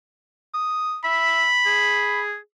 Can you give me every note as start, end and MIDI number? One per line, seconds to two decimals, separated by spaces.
0.54 0.98 87
1.05 1.47 76
1.05 2.21 83
1.66 2.37 68